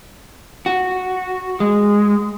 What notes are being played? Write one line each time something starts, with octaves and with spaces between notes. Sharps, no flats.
F#4
G#3